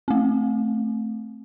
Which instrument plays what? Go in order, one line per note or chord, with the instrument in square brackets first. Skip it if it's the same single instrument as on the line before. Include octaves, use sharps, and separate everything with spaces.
[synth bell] A3 C4